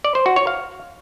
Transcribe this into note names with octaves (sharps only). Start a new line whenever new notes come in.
D5
C5
F#4
C#5
F5